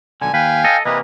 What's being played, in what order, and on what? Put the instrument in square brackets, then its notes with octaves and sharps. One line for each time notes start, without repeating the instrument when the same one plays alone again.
[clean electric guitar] B1 D3 [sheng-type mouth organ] G#5
[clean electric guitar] D#2 B4 [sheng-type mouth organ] F5 G5 G#5
[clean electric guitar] A4 D#5
[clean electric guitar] C3 E3 A#3 [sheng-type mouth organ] B4 D#5